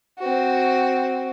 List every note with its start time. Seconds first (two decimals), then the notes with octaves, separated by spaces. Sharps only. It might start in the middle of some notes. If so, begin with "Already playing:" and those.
0.19 C4 F#4